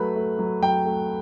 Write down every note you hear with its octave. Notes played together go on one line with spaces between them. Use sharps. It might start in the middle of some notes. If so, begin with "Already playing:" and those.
Already playing: F#3 A3 B4 B5
A3
F#3
F#3 G5
A3